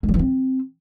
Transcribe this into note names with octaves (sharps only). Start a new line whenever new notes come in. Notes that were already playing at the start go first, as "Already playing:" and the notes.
G#3
F3
E3
C4